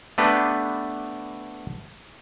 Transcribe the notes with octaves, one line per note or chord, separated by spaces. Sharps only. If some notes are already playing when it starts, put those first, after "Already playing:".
A3 B3 D4 G4 B4